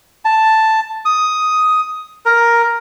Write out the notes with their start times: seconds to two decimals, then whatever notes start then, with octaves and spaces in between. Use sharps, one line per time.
0.25 A5
1.05 D#6
2.25 A#4